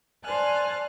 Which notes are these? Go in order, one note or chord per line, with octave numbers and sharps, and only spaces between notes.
C5 D5 G#5 A5 F6 F#6